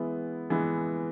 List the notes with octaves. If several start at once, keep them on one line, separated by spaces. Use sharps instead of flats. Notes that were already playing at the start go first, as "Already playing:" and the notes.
Already playing: E3 G#3 B3 E4
E3 G#3 B3 E4